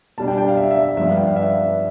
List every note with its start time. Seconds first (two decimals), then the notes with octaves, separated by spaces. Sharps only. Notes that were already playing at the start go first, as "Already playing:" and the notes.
0.18 B2 G3 D4 A5
0.28 G5
0.38 G5
0.48 F5
0.57 E5
0.71 E5
0.84 E5
0.97 G2 F3 B3 D4 E5
1.07 F5
1.17 G5
1.27 F5
1.36 E5